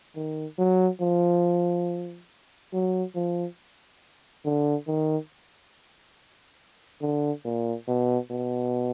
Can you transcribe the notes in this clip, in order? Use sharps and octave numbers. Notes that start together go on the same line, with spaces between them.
D#3
F#3
F3
F#3
F3
D3
D#3
D3
A#2
B2
B2